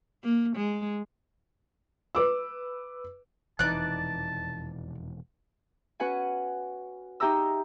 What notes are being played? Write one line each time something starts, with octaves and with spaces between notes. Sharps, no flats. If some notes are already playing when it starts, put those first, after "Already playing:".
A#3
G#3
B4 D6 E6
E1 F2 C3 E3 D#4 D5 A5 F#6
C#4 F#4 B4 F#5 G#5
D#4 G4 E5 A#5 E6